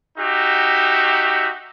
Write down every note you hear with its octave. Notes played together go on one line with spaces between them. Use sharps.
D#4 F#4 G4 E5